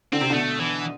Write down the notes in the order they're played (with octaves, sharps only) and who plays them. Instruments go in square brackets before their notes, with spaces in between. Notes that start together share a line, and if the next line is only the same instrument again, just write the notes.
[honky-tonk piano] D3 [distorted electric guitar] C4
[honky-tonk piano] C3
[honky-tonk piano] B2 D3 [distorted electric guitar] A3
[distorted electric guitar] E3